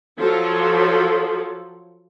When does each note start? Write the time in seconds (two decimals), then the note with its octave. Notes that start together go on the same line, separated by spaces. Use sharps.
0.17 F3 F#3 A4